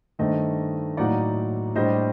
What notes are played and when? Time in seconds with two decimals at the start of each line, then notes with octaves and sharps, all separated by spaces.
0.19 G2 D#3 A3 D4 C5 D#5
0.97 A2 F#3 A#3 D#4 D5 F#5
1.75 A2 G3 D4 C5 D#5